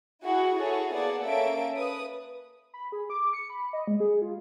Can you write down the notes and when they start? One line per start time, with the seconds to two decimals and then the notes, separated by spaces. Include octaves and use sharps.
0.23 E4 F#4 G#4
0.55 E4 F#4 G#4 A4 C#5
0.94 A#3 B3 G#4 D5 F#5 A5
1.24 A#3 C#4 A4 E5 D7
1.75 B4 D#6
2.74 B5
2.92 G#4
3.10 D6
3.33 C#7
3.50 B5
3.73 D#5
3.87 G#3
4.00 G#4
4.22 F4